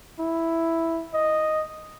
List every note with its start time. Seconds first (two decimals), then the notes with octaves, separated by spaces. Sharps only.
0.19 E4
1.14 D#5